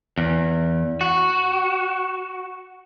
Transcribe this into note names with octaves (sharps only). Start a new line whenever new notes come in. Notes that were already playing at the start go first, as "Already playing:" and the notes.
E2
F#4